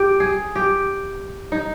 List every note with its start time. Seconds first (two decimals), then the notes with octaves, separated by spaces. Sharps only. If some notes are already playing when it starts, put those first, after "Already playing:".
Already playing: G4
0.20 G#4
0.55 G4
1.52 D#4